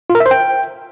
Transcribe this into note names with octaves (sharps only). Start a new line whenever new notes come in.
F4
A#4
E5
C5
G5